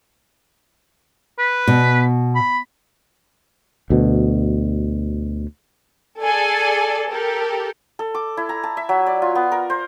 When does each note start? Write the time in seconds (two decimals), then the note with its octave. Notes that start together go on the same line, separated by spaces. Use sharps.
1.38 B4
1.68 B2
2.35 B5
3.90 D2 B2
6.22 G#4 A4 D5 G#5
7.11 G4 A4 A#4
7.99 A4
8.14 D6
8.37 E4
8.49 A#5
8.64 A5
8.77 E5
8.89 F#3
9.06 D5
9.22 F4
9.35 B3
9.52 A#4
9.70 C5